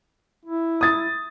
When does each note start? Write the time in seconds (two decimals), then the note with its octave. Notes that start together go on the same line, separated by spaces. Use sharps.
0.45 E4
0.81 D#6 A6